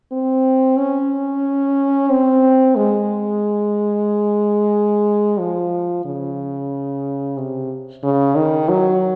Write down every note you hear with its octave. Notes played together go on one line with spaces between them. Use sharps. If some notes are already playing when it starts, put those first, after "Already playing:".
C4
C#4
C4
G#3
F3
C#3
C3
C#3
D#3
F#3